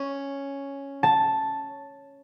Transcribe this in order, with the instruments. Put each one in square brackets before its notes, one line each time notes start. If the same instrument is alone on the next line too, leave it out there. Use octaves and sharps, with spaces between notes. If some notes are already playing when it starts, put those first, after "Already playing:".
Already playing: [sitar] C#4
[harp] A5